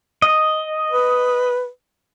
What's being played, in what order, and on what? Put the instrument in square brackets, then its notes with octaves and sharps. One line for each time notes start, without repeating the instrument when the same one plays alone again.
[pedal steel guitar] D#5
[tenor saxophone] B4